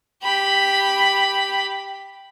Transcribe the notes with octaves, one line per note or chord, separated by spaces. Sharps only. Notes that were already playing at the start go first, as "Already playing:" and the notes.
G4 B5